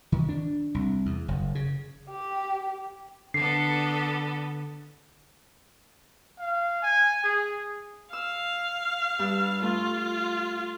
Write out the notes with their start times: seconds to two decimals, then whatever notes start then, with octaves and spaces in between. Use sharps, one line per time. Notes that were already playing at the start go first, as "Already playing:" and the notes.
0.12 D#3
0.29 D4
0.75 C2
1.06 E2
1.28 F#1
1.55 C#3
2.10 G4
3.34 D3 B3 D4 A4 C7
6.39 F5
6.82 G#5
7.24 G#4
8.13 F5 E6
9.19 G2 E6
9.63 A3 F4